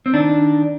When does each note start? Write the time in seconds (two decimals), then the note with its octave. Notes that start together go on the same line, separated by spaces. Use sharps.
0.06 C4
0.14 D#3 D4